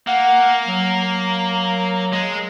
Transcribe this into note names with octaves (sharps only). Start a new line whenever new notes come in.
A#3 F#5
F#3
G#3